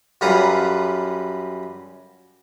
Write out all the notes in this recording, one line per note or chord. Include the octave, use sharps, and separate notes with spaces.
F#2 G3 F4 A4 B4 A#5